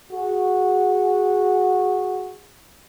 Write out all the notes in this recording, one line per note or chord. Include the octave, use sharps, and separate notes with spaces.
F#4 G#4